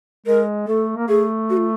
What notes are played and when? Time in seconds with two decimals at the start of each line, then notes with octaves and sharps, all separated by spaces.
0.26 G#3 A#4
0.67 A3 A4
0.97 A#3
1.08 A3 G#4
1.50 F#4
1.57 F4